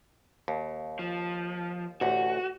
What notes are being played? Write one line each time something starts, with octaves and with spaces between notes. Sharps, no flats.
D#2
F3
A1 D2 F#4